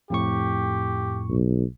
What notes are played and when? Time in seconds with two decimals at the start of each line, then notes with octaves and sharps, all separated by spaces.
0.10 F2 A2 G4 C#6
1.29 B1